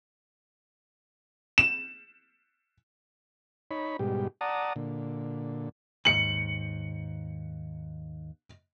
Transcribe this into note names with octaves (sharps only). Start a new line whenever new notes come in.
E7
D#4 C#5 B5
G#2 B2 G3 G4
D5 F#5 A5 A#5 D#6
A#2 D3
D#2 G#2 C#7 F#7